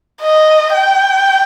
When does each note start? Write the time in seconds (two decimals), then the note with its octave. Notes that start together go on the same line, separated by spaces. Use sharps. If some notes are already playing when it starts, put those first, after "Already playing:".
0.22 D#5
0.74 G5